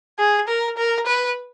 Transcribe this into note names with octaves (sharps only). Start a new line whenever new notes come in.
G#4
A#4
A#4
B4